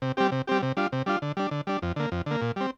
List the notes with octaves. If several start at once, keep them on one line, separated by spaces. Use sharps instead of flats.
C3
G3 C4 G4
C3
G3 C4 G4
C3
G3 D4 F4
C3
G3 D4 F4
D3
G3 D4
D3
G3 D4
F2
D3 A#3
F2
D3 A#3
A#2
G3 C4